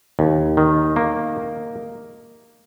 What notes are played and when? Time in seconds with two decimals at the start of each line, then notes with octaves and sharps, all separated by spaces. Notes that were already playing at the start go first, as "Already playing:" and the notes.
0.19 D#2
0.57 D#3
0.96 A#3